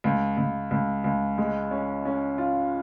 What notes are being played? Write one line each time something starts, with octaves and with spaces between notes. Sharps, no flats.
C#2
C#2
C#2
C#2
G#3
C#4
C#4
F4